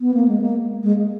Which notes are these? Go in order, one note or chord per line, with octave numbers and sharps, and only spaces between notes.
B3
A#3
G#3
A#3
G#3